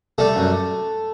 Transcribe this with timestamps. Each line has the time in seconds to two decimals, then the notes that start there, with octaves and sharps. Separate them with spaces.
0.18 G3 A3 A4
0.36 F#2